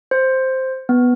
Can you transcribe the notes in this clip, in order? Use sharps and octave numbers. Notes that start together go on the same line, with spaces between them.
C5
B3